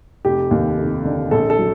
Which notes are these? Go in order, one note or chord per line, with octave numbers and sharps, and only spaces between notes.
F1 G4
D#2
F1
D3
A#1 A4
A4
F#3